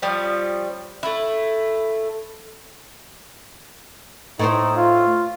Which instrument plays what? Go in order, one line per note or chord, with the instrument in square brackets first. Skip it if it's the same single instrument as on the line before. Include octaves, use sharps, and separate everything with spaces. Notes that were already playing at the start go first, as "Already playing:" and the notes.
[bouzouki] F3 G3 C#4
A3 E4
[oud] A2 C5 [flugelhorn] D#4
[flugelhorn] F4